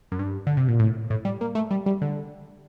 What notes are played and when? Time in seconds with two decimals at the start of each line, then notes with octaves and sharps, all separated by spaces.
0.12 F#2
0.19 G2
0.47 D3
0.57 C3
0.68 A#2
0.79 A2
1.10 A2
1.25 G3
1.41 A#3
1.55 A3
1.71 G3
1.86 G3
2.02 D3